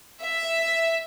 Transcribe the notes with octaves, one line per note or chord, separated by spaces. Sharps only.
E5